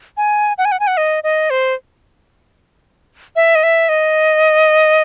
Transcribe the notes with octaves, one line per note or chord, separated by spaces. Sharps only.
G#5
F#5
G#5
F#5
G#5
F#5
D#5
D#5
C5
E5
D#5
E5
D#5